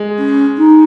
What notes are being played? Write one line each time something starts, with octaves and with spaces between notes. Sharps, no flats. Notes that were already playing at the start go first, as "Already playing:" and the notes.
Already playing: G#3
C#4
D#4